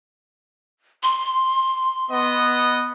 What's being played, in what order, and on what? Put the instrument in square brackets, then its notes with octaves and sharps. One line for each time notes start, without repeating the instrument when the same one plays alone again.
[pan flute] C6
[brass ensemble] B3 D#5